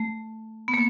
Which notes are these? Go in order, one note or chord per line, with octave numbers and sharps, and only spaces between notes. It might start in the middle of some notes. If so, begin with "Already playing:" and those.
Already playing: A3
B3
A#3